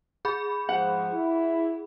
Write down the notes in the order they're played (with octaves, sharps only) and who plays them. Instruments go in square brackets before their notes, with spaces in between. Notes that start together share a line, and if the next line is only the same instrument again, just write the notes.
[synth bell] G#4 B5
[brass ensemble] G#2 F3 [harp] F#5
[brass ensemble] E4